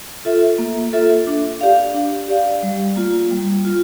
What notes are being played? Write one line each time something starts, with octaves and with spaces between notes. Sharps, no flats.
F4 A4 E5
A#3
F4 A4 E5
D4
G4 D5 F5
D4
G4 D5 F5
G3
A#3 F4
G3
F4